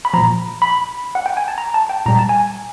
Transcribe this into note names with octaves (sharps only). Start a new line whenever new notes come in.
B5
A#2 F3 A#5
B5
F#5
G5
G#5
A5
A#5
A5
G5
A#2 G3 A#5
A5
G#5